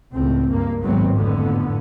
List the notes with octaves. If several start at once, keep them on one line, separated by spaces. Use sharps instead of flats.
C#2 A2 C4
G2 A#3
G#1 D#2 A2 F#3 B3 C4
F2 A2 D3 B3